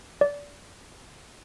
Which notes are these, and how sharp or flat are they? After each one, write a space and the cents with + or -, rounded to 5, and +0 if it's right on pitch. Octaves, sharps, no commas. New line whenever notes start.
D5 -25